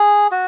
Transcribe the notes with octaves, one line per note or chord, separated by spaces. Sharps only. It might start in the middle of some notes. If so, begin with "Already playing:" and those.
Already playing: G#4
F#4